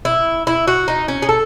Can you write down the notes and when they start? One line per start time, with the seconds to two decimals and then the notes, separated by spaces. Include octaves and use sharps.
0.05 E4
0.47 E4
0.68 F#4
0.88 D#4
1.08 C#4
1.22 G#4
1.29 A4